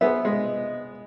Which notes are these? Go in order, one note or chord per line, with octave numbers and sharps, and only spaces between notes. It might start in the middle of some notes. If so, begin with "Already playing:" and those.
B3 G#4 C5 E5
G#3